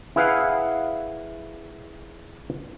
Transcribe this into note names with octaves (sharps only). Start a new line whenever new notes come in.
E4 G#4 B4 F5 F#5